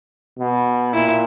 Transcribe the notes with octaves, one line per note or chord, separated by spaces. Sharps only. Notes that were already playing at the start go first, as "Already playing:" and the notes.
B2
A#2 E4